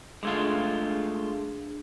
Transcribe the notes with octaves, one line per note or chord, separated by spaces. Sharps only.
G#3 A3 D4 F4 G#4